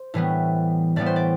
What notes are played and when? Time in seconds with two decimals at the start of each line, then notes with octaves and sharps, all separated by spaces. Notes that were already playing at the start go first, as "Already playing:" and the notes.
Already playing: C5
0.14 A2 E3 G3 B3
0.96 A2 E3 G3 B3 D5
1.06 C5
1.16 D5